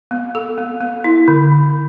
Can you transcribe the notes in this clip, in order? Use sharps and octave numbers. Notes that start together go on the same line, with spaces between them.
B3
A4
B3
B3
E4
D3
D3